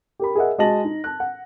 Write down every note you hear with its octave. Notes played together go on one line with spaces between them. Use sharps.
G4 A#4 B5
G#4 A#4 D#5 E5 F#5
G#3 F#4 D#5 A5 A#6 F#7
D#4
A5 F#6
F#5